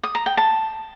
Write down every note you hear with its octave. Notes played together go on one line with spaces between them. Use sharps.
D#6
A#5
G5
A5